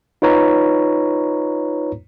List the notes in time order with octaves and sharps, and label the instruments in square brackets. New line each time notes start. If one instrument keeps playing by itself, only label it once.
[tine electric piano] D#4 F4 B4 C#5 A#5